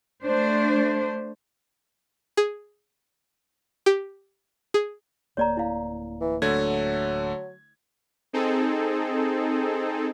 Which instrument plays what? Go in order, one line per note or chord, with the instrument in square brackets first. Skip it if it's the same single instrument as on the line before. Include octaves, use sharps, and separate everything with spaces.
[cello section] A3 D4 C5
[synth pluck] G#4
G4
G#4
[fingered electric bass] D1 A#3 [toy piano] C#5 D5 A#5
[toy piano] E4 F5
[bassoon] E3
[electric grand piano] D3 A3 G#6 [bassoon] F#3
[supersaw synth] C4 D#4 G#4 A4